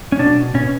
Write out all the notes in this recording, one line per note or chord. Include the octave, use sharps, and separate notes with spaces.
C#4
B2 D4
B2 C#4